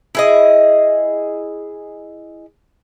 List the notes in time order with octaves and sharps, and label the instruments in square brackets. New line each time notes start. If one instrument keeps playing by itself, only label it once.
[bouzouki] E4 G#4 D#5